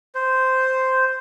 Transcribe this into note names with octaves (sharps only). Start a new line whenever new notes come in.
C5